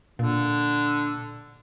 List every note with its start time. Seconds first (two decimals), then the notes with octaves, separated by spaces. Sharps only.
0.19 A#2 D3